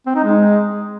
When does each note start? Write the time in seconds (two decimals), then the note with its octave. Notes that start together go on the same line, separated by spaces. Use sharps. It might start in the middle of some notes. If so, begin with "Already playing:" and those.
0.06 C4
0.15 D#4
0.24 G#3